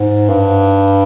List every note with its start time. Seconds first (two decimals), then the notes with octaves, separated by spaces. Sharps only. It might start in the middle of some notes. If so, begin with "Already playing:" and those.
Already playing: G#2
0.29 G2